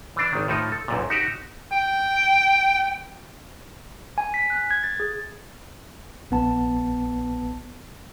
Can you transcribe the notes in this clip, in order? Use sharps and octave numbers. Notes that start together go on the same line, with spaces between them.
E3 D4
G#1 D#3
A2 F3 D#4
A4
B1 F#2 A#2
D#4 F#4 G4
G5
G#5
B6
F#6
G#6
A6
G#4
A#1 B3 A5